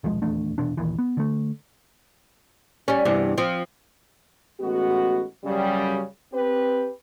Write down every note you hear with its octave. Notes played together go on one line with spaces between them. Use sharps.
D#1 B1 F3 G#3
D#1 E2 A3 D4
F1 E2 B2 D4
A#1 D#2 E3
B3
D3 A3
G3 C#4
E2 G2 C3
F3 C4
A1 G#3 B3 F#4
F#2 C#3 G3
C4 G4 B4